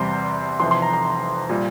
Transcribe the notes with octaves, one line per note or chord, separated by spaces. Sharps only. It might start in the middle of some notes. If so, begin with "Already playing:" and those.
Already playing: E2 C3 G3 A#5 C6
F1 F2 E3 C6
C6
A#5
A#5
A#2 G3